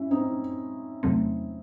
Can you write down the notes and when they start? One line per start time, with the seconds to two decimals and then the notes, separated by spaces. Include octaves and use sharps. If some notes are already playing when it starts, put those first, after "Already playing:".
Already playing: C#4 E4
0.11 C4 D#4
1.03 E2 C3 F#3 A3 C4